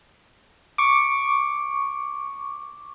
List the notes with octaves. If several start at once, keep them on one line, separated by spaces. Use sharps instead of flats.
C#6 D6